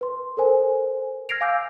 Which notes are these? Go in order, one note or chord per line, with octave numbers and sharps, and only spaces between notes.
B4 C6
A4 A#4 C5 G#5
F6 G#6 A#6 C7 D7 F7
F5 G#5 D6 E6 G6